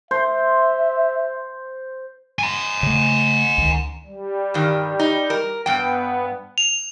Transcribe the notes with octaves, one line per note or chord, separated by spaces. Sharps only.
C5 E5
G#5 A#5
C#3 A3
C#2 D#3
G3
G2 D#3
D#4
A#4
G2 B3 G5
F7